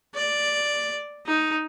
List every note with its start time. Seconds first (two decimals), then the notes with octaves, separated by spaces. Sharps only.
0.15 D5
1.26 D#4